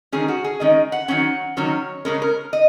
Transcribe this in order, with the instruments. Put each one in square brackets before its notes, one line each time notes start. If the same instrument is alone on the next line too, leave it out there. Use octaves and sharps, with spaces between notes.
[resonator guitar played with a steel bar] D#3 G#3 C#4 G#4
F#4
G#4
D#3 G#3 C#4 D#5
F#5
D#3 F#3 C#4 F#5
D#3 F#3 C#4 C#5
C#3 G#3 C#4 A#4
A#4
D#5